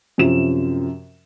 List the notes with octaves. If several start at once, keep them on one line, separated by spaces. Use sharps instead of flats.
F#2 C3 F3 E7